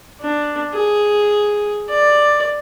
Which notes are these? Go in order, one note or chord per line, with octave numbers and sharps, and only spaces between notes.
D4
G#4
D5